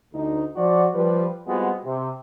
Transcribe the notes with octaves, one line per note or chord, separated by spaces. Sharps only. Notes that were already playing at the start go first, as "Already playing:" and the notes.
D2 D#4
F3 F#4 D5
F3 G3 B4
G3 G#3 B3 C4 F4 F#4
C3